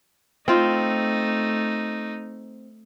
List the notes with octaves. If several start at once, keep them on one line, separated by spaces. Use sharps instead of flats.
A3 C4 D#4 F4